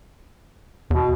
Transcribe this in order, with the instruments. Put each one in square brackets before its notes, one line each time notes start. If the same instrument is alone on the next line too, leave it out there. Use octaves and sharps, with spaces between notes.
[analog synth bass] E2 [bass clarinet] B2